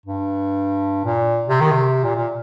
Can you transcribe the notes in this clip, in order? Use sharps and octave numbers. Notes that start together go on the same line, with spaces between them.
G2
A#2
C3
D#3
C3
A#2
A#2